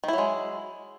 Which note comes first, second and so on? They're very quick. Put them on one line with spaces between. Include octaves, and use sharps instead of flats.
D#3 E4 F#3 G#3